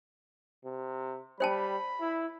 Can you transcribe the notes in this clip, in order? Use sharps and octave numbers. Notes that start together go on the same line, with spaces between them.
C3
G3 C5 G5 A5 B5
E4